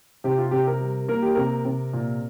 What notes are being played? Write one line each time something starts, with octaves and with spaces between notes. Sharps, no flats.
C3 G4
F4
C3 G4
A#4
G3
A#3 A#4
G4
C3 A#4
C3
A#2